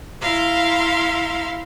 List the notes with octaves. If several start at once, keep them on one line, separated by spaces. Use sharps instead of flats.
E4 F5 A#5 C6